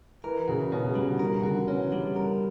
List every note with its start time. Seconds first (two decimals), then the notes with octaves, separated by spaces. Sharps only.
0.24 E3 A#4
0.48 C#3 F#4
0.72 B2 C#4
0.85 C#3
0.95 C#3 G3
1.08 D3
1.19 E3 A#4
1.39 C#3
1.43 D3 F#4
1.68 E3 C#4
1.92 G3
2.16 A#4